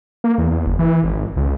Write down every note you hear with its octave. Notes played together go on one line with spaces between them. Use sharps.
A#3
E2
E2
F#1
E3
G#1
C#2